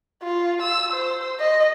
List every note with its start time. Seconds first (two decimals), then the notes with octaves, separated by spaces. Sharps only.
0.23 F4
0.62 E6
0.93 C5
1.39 D#5